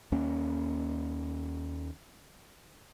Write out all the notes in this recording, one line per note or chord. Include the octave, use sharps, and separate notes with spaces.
D#2 A#3 C#4